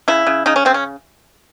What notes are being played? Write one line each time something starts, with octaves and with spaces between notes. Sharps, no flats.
C#3 E4
C#3
C#3 D#4
C#4
C#3 C4
C#4